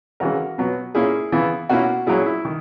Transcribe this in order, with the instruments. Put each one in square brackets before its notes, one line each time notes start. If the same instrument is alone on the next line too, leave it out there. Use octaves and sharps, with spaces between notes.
[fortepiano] C#3 E3 G#3 C#4 F#4 A#4
B2 F#3 B3
A#2 A#3 C#4 E4 G#4
C#3 E3 B3 E4
B2 A#3 C#4 E4 F#4
A#2 F#3 C#4 E4 G#4
E4
D#3